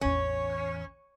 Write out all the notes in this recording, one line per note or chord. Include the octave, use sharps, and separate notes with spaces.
A1 E2 C#4 C#5